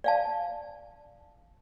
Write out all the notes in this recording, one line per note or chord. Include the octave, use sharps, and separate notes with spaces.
D5 F5 A5